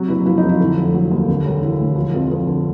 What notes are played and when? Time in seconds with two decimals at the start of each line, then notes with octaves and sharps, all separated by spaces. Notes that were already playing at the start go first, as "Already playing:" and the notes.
Already playing: C3 F#3 F#4
0.08 F#1 E4
0.26 F3 E4
0.37 D#4
0.43 F2
0.49 E4
0.60 D3
0.77 F1
0.94 F#3
1.11 D#2
1.29 D3
1.45 E1
1.62 E1 E4
1.80 D2
1.96 F3
2.14 F2
2.31 F2
2.47 D3